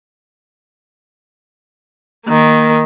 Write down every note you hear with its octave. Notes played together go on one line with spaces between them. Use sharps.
D#3 A#3